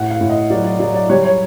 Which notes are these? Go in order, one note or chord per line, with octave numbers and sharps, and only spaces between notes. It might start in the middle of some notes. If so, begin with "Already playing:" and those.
Already playing: A2 F#5
F5
A2
D#5
F#3 D5
D5
F#3 D5
D5
G3 C#5
C#5